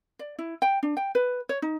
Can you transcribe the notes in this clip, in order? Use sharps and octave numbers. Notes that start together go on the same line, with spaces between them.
D5
E4
G5
D4
G5
B4
C#5
D#4